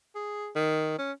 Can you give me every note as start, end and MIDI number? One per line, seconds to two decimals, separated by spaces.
0.15 0.49 68
0.55 0.94 51
0.98 1.12 61